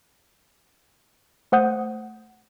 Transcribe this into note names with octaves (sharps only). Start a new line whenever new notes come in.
A3 C5 F#5 D#6 G6